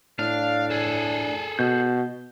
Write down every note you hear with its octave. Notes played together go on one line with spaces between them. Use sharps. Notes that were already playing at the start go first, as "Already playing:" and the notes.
A2 D4 F5
G#4 A4
B2 G6